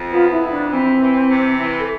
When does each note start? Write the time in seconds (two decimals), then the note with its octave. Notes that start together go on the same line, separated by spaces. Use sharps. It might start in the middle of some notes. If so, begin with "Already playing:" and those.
Already playing: F2
0.12 B3 F4
0.31 E4
0.41 F2
0.51 D4
0.71 E3 C4
1.00 E3
1.30 C3
1.59 E3
1.79 A4